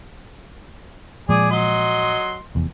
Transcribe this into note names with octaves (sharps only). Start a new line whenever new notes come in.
A#2 F3 G#3 G#4 D5
F#3 D#5 C6
F1 E2